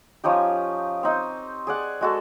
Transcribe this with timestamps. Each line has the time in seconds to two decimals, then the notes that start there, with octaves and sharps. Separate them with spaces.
0.24 F3 C#4 D#4 G4
1.03 C4 D#4
1.67 G#4 D5 F#5
2.01 G#3 F#4 A4